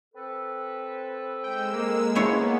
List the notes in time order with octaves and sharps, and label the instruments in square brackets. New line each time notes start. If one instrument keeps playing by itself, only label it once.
[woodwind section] C4 A4 B4
[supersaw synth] G#3 E6 [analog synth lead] G5
[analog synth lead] A#3
[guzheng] G#3 E4 C#5 [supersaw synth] B3